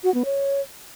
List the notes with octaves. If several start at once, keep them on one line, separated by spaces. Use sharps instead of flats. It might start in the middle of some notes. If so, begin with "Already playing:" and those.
F#4
B3
C#5